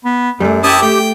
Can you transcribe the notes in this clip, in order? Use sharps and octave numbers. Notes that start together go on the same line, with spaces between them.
B3
F#2 G3 A3
C#4 E4 G4 A5 D#6
A3 G5